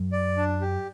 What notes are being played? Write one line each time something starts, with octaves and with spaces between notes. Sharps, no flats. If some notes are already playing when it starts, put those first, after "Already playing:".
Already playing: F#2
D5
D4
G4